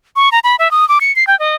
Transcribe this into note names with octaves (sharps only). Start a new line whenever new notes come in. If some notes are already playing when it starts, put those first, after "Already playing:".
C#6
A#5
B5
E5
D#6
D6
C#7
C7
G5
D#5